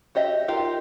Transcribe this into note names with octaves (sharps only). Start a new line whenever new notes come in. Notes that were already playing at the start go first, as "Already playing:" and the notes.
F#4 G4 D#5 E5
D#4 F4 G4 A#4